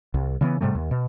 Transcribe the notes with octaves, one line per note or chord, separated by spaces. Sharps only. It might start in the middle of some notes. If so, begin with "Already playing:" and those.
C2
C#3 E3 B3
G#2 C3 G3 A3
D#2
B2